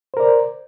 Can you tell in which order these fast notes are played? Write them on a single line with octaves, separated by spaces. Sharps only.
C5 A#4 D5